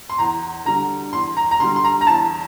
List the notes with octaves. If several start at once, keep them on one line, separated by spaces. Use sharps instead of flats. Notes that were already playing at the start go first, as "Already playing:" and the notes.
C6
E2 A#5
D3 G3 A#5
E2 C6
A#5
A#5
D3 G3 C6
C6
A#5
A#5
E2 A5